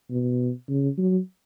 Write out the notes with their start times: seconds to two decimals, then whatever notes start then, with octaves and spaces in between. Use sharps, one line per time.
0.10 B2
0.69 C#3
0.98 F#3